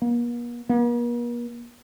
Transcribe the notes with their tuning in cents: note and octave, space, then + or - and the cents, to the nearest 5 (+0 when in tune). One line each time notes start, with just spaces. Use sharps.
A#3 +45
A#3 +45